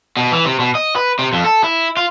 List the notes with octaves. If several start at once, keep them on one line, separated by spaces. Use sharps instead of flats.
B2
E3
C3
B2
D#5
B4
C3
F2
A4
E4
F4